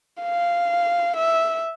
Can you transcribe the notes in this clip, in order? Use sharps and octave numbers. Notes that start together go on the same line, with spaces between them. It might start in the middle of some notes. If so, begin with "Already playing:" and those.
F5
E5